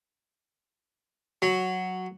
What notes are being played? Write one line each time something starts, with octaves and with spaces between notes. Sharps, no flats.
F#3